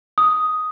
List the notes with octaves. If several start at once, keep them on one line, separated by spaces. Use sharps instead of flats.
D#6